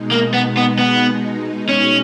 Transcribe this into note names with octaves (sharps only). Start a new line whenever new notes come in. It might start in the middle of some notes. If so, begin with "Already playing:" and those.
Already playing: B2 G#3 D#4
A#3
B3
B3
B3
C#4